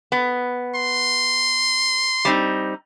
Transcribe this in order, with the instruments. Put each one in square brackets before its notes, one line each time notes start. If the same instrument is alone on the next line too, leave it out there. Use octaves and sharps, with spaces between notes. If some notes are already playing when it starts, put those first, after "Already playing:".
[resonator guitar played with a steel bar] B3
[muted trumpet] C6
[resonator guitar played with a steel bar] G3 C4 D#4